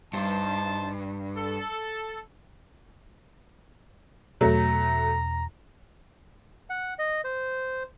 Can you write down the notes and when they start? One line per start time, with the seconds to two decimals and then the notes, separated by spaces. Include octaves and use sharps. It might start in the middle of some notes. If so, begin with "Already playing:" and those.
0.13 G2 D#4 C5 A5
1.36 A4
4.41 E2 B2 F#3 A3 A#5
6.70 F#5
6.99 D#5
7.24 C5